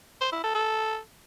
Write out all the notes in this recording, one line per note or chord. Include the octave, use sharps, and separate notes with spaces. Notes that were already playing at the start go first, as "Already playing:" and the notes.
C5
E4
A4
A4